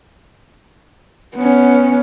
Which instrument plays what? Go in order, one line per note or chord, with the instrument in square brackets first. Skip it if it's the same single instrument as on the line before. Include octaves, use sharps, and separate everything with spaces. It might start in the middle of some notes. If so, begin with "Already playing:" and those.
[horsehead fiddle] B3 C#4